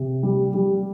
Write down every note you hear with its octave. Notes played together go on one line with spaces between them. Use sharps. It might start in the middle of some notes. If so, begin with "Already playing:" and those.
Already playing: C3
G3
G3